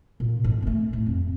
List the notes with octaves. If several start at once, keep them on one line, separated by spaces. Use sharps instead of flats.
A#2
G#2
A3 A#3
A2
F2